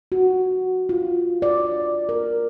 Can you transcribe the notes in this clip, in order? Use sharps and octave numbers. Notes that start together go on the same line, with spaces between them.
F#4
F4
D5
A#4